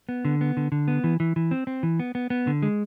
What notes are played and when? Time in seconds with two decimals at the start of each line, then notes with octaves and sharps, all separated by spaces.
0.09 B3
0.25 D3
0.41 B3
0.57 D3
0.72 D3
0.88 B3
1.04 E3
1.20 E3
1.36 E3
1.51 C4
1.67 C4
1.83 E3
1.99 B3
2.15 B3
2.30 B3
2.47 D3
2.62 G#3